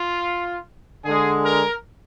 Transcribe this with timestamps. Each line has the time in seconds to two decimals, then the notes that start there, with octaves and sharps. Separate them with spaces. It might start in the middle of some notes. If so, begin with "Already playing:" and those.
Already playing: F4
1.05 D3 G#3 G#4
1.45 A#4